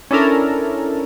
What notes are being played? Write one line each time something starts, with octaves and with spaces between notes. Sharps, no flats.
C#4 D4 E4 A4 A#4